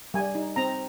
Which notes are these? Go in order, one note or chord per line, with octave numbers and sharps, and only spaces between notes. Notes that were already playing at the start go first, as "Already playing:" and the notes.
G3 G#5
D#4
C4 A#5